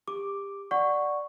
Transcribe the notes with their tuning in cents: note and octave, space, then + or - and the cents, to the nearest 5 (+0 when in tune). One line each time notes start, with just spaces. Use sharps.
G4 +25 D6 +0
D5 +0 F#5 +0 C#6 +0